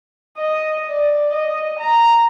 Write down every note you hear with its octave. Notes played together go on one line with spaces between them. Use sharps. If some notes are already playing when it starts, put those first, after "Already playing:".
D#5
D5
D#5
A#5